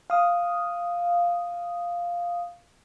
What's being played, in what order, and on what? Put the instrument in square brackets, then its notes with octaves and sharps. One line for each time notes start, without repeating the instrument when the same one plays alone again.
[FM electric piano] F5 D#6